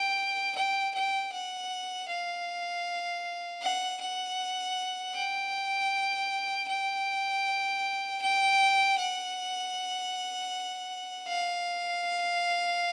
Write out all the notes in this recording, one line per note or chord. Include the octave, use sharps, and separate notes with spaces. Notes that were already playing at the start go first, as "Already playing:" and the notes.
Already playing: G5
G5
G5
F#5
F5
F#5
F#5
G5
G5
G5
F#5
F5